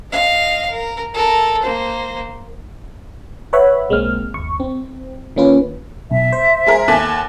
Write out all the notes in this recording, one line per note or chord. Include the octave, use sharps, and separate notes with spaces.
D#5 F5
A#4
A4 A#4
A#3 C5
B4 C#5 E5 F#5 B5
B1 G#3 A#3 C4 F6
G1 D#2 C#6
C4
D#3 A#3 C#4 F4 B4
B1 E5
C5
G#3 G#4 A#4
D#2 A4 G#5 F#6